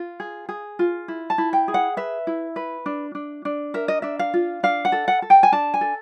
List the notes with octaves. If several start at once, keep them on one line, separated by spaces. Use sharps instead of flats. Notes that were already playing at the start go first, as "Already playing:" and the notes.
Already playing: F4
G#4
G#4
F4
E4
A5
E4
G5
G#4
F#5
B4 E5
E4
B4
D4
D4
D4
A#4 E5
D#5
D4 E5
F5
F4
D4 F5
F#5
A4
F#5
A4
G5
G#5
D4 A5
G#5
A4